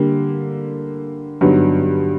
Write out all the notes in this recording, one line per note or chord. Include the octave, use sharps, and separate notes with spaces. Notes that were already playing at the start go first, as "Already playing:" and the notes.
Already playing: D3 G3 A#3
G2 D3 F#3 B3 D#4